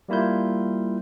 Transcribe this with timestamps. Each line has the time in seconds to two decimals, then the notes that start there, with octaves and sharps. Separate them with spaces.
0.09 G3 A#3 E4 F4 G6